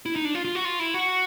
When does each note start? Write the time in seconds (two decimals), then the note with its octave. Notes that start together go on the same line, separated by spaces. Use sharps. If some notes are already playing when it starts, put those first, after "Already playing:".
0.06 E4
0.16 D#4
0.25 D4
0.35 F4
0.45 F4
0.55 F#4
0.65 F4
0.79 E4
0.94 F#4